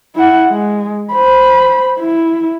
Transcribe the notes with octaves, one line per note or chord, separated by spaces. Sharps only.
E4 F#5
G#3
C5 B5
E4